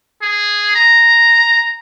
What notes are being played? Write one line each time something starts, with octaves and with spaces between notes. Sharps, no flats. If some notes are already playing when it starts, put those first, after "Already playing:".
G#4
A#5